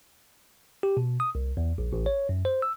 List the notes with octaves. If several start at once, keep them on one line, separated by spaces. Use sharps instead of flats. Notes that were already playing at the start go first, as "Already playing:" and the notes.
G4
B2
D#6
C2
E2
A#1
A1
C#5
F#2
C5
E6